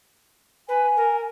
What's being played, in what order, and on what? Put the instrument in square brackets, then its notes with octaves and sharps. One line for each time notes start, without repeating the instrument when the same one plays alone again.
[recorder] B4 [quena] G#5
[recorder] A#4